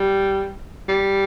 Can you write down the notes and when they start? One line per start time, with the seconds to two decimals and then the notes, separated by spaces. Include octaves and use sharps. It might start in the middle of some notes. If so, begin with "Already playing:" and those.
Already playing: G3
0.88 G3